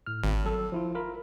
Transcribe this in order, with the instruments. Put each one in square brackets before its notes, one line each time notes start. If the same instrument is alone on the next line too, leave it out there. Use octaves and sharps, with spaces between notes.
[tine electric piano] A2 F6
[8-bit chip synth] G#1
[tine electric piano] F#3 A4 E6
F3 E4 F4
F4 A#4 B5